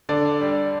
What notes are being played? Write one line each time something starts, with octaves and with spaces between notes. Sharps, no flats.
D3 D5
G3